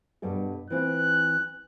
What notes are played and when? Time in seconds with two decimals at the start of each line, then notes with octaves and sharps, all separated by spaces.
0.22 G2 B2 A4
0.70 E3 C4 F4 F#6